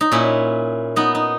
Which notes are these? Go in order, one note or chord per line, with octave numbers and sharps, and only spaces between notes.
D#4
A#2 C#4 E4
B3 D#4
D#4